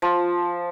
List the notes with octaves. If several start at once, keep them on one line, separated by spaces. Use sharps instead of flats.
F3